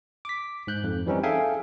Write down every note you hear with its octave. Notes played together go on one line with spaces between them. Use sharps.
D6 B6
G#2 F#6 G6
F2
E3 G3 C4 C#4 D#4
G#4 A4 E5 F5 G5 G#5